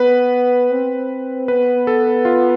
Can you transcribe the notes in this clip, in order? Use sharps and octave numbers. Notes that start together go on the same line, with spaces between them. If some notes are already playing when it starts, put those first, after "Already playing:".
Already playing: B3 B4
C4
B3 B4
A4
F4